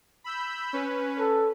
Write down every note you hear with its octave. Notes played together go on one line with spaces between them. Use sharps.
B5 E6 G6
C#4 B4
A4